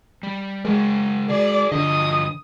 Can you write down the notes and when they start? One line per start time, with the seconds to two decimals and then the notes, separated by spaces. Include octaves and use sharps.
0.23 G3
0.65 C#3 G#3 A#4
1.30 F#4 G#4 D5
1.72 G2 D3 F4 D#5 D#6